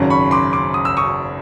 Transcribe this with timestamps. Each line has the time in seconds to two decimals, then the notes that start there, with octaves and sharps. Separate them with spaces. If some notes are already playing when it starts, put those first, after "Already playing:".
Already playing: G#1 F#2 C#3
0.10 B5 C#6
0.31 C6 D6
0.53 C6 D6
0.74 D#6
0.85 E6
0.97 C#6 D#6